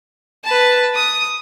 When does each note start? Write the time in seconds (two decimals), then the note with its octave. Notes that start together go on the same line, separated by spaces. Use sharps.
0.44 B4 A5
0.95 D#6